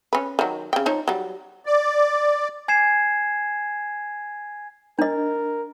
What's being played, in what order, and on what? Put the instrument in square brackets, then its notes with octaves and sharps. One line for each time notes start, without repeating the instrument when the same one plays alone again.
[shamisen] C#4 B4
D#3 F#3
C#3 G5
F3 D#4 C#5
F#3 G3
[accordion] D5
[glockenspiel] G#5 G#6 C7 E7
[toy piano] D4 D#5 [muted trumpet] A#4